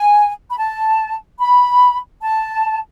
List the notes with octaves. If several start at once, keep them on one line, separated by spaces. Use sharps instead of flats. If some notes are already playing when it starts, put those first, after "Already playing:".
Already playing: G#5
B5
A5
B5
A5